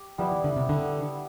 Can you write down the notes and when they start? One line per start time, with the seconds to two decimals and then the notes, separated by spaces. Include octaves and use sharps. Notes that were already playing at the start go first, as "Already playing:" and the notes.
Already playing: G4
0.18 F3 G3 B3 E4 B4
0.32 E3
0.44 D3
0.56 C3
0.69 D3